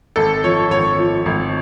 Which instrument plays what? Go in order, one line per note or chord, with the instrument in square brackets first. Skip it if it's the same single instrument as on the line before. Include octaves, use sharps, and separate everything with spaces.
[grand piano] G#1 A4
F3 C#5
G#1 C#5
F3
G#1